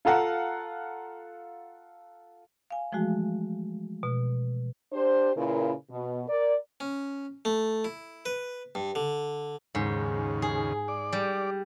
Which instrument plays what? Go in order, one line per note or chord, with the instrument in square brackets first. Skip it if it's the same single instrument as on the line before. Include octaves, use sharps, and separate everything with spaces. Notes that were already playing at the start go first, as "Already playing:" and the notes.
[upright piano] F4 A4 F5 F#5 A#5
[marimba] F5 G#5
E3 F3 G#3 A3 F#4 G#4
B2
[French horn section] D4 G4 C5
A#2 C#3 E4 A#4 B4
B2
A#4 D5
[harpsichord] C#4
A3
E4
B4
G2
D3
[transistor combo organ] D#2 C#3 [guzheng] G#2
[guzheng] G#4
[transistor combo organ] D5
[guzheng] G3